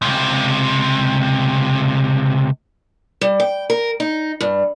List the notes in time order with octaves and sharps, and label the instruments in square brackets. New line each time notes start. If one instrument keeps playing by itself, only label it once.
[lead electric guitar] C#2 C3
[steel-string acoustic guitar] G3
G5
A#4
D#4
G2